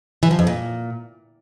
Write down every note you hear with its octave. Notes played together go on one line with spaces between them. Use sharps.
E3
F3
F2
A#2